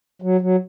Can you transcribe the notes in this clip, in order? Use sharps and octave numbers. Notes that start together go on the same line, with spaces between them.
F#3
F#3